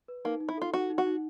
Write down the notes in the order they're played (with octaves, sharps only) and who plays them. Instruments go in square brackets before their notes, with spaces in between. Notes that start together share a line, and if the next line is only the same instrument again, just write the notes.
[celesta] B4
[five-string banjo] A#3 [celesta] D#4
[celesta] D#4
[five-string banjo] E4
[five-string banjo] F4 [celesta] A4
[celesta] D#4 [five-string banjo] F#4
[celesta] D#4
[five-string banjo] F#4
[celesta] D#4